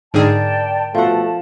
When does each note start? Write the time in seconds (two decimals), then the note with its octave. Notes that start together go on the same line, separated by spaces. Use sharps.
0.14 G#2 D3 G#4 A#4 D5 G5 A5
0.95 B2 F3 A3 F#5 A5